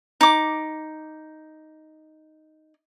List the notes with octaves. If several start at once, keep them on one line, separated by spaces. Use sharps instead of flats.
D#4 D6